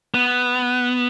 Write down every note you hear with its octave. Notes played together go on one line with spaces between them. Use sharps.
B3